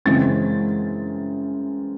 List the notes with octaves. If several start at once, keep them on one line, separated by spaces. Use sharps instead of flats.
F#2 C#3 E3 G#3 C4 A6